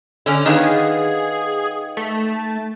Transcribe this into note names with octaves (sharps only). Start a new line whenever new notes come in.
D3 C#4
D#3 B3 G#4 D#5 F5
A3